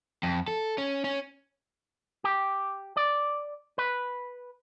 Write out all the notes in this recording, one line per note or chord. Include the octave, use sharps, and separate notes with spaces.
F2
A4
C#4
C#4
G4
D5
B4